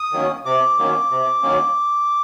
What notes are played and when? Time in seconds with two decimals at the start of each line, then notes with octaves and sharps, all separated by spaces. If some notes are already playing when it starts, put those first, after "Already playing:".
Already playing: D#6
0.12 D#3 F#3 A#3 C#4
0.45 C3 D6
0.78 D#3 F#3 A#3 C#4
1.10 C3
1.42 D#3 F#3 A#3 C#4